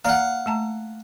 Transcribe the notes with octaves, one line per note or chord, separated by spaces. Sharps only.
A#3 D5 F5 F#5 A#5
A3 A5 A#5